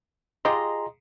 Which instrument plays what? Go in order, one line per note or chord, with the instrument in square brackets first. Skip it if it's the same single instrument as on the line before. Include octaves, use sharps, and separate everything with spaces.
[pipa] F4 G4 D#5 [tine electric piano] G#4 A#5 C6